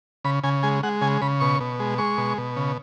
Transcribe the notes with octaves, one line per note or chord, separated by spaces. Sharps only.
C#3 B5
C#3 G#5
G#3 G#5
G#3 F#5
C#3 G#5
C#3 B5
B2 C#6
B2
G#3
G#3 C#6
B2
B2
C#3